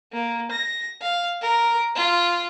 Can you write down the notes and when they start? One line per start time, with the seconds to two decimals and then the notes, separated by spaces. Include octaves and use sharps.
0.13 A#3
0.52 A#6
1.02 F5
1.42 A#4
1.95 F4